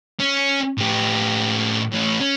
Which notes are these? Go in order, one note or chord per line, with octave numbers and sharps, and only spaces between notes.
C#4
A2 G4
A2 C#4
C#4